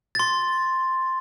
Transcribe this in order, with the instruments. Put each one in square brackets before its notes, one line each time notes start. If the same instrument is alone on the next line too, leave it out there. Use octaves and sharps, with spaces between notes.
[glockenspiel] C6 A6